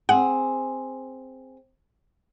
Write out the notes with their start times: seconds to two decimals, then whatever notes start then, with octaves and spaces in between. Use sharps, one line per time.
0.09 C4 G#4 F#5